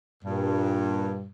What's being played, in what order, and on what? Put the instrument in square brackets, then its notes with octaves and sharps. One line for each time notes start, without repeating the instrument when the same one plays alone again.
[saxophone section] G2 A#2